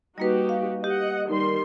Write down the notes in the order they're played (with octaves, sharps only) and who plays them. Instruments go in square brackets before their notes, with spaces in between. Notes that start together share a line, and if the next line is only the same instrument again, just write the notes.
[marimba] G3 A#3 B4 [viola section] D#4 F#4 G4
[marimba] F5
[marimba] G4 [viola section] D#5 F#5
[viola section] D#3 G3 C6